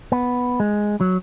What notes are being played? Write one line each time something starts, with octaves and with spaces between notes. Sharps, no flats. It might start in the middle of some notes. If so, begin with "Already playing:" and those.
B3
G#3
F#3